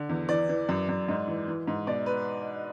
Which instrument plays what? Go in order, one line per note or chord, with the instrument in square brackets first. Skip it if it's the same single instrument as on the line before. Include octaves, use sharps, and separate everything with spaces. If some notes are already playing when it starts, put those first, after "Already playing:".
Already playing: [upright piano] D3
E2
E3 D5
E3
F#2
F#2
G#2
E3
E3
G#2
B2 D5
B4